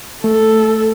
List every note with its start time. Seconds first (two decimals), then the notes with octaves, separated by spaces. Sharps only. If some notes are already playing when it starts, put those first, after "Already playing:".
0.24 A3 A4